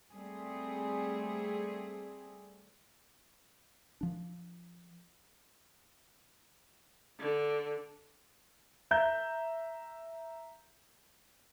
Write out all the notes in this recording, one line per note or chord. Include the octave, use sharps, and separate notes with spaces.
G3 A3 C4 G#4
F3 D4
D3
E5 A#5 G6